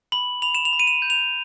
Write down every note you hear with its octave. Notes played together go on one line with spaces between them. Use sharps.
B5 F#7
B5 F7
E7
F7
B5
D#7
E7
G6
F7